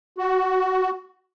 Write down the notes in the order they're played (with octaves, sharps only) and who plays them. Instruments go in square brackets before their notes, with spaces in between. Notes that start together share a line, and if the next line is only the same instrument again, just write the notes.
[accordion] F#4